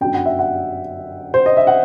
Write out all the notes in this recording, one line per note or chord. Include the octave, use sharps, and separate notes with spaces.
G1 F#2 F#3 G5
F#5
E5
F#5
C5
D#5
E5
F#5